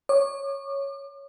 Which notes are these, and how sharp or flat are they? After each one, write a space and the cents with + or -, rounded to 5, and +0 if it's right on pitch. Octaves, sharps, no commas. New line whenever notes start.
C#5 +0 D6 +40